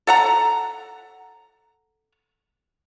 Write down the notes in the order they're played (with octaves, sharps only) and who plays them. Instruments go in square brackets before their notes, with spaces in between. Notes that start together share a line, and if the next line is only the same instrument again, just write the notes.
[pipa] A4 F#5 A#5